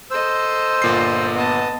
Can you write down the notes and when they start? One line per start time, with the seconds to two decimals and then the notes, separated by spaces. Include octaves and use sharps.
0.11 A4 C5 D#5 E6
0.82 G1 A#2 C7
1.36 B3 D#5 A5